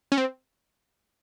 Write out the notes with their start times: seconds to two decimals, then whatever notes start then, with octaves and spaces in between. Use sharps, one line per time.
0.12 C#4
0.18 C4